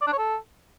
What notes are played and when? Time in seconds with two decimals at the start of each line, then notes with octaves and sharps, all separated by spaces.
0.01 D5
0.07 D4
0.13 C#5
0.18 A4